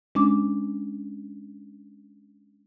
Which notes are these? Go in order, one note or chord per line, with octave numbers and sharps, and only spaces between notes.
G#3 C#4 D4 D6